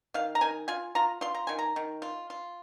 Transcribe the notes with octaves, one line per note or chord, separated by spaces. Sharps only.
D#3 F5
A#5
D#3 G#5
F4 G#5
F4 A#5
F4 C6
A#5
D#3 G#5
A#5
D#3
F4
F4